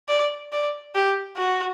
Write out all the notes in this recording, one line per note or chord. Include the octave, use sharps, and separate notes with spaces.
D5
D5
G4
F#4